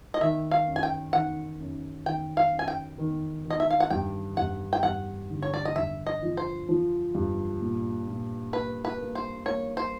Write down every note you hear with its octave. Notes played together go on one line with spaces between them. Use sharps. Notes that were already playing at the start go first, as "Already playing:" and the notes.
D#5
D#3 E5
F5
F#2
G#5
G5
D#3 F#5
F#2
D#3 G5
F5
F#2
G#5
G5
D#3
D#3
D#5
E5
F5
F#5
G2 G5
G2 F#5
G5
G2 F#5
D3
C#5
D5
D#5
G2 E5
D#5
F3
C5
F3
G2
A#2
A#2
A#3 B4
B4
A#3
C5
A#3 C#5
C5